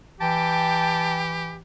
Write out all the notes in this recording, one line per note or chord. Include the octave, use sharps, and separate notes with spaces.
E3 G4 G5 A5